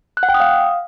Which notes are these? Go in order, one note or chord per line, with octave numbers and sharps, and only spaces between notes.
F#6
F#5
G5
D#6
F5